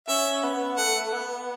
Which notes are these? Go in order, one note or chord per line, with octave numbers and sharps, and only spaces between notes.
C#4 E5
B3
A3 F#5
B3